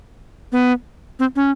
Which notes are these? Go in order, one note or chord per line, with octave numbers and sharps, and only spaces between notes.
B3
C4
C#4